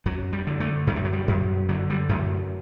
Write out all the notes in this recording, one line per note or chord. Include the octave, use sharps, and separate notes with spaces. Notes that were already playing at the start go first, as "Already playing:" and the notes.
F#2 F#3
G3
D3
A3
F#2 A3
G3
F#3
G3
F#2
D3 F#3
G3
F#2 A3